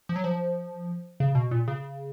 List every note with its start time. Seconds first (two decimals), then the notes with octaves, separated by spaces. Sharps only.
0.09 F3
0.16 F#3
0.24 F3
1.20 C#3
1.35 B2
1.51 A#2
1.68 C#3